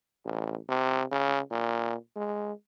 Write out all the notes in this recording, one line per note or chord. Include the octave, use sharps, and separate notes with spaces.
A1
C3
C#3
A#2
G#3